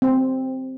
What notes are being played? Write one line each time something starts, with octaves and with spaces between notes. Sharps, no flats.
C4